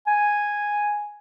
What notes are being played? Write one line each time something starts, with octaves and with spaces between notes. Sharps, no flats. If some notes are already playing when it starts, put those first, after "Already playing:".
G#5